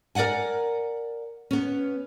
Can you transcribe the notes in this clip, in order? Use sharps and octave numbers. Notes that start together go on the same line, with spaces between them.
A#4 D5 E5 F#5 G#5
B3 C#4